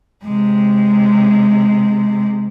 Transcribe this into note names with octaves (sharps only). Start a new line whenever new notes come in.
C3 G#3